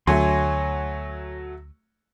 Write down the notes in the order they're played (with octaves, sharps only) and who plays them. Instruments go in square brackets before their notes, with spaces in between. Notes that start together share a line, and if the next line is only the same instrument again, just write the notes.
[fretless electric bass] D2 [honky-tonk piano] F#3 A3 [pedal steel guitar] C#5 G#5 C6